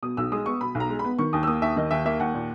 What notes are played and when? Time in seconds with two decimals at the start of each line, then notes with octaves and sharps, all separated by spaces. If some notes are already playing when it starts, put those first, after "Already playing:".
0.03 B2 D#6
0.17 B1 E6
0.32 G#3 D#6
0.46 B3 C#6
0.61 B2 B5
0.75 B1
0.80 A#5
0.90 G#3
0.99 B5
1.04 B3
1.18 D#3 C#6
1.33 D#2 D#6
1.43 E6
1.47 A#3 D#6
1.62 D#2 E5
1.77 D#3 D#5
1.91 D#2 E5
2.05 A#3 E5
2.20 D#2 F#5
2.34 A#2